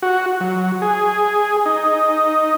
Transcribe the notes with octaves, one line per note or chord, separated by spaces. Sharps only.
F#4
F#3
G#4
D#4